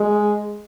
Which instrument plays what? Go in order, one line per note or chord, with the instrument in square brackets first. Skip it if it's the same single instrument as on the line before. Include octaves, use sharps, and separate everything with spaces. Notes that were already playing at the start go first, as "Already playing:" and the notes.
Already playing: [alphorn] G#3